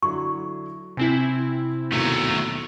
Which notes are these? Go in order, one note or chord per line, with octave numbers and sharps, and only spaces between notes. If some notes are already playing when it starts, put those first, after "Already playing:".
D3 F#3 E4 C#6
C3 C4 E4 G#5 B6
D#2 B2 F#3 A3